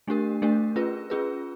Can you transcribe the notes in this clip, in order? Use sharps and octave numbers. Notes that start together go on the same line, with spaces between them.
A3 D4 G4 A#4
A3 D4 G4 A#4
C#4 F4 G#4 B4
C#4 F4 G#4 B4